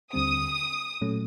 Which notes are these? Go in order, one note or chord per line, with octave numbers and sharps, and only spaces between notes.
D#2 D3 G3 C4 D#6
A#2 F#3 A3 C#4